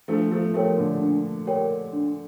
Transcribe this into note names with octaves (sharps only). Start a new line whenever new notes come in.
F3 A3 D4
F3 A3
F3 A3 G4 A#4 C#5 G5
A#2 D3
D4
G4 A#4 C#5 G5
D4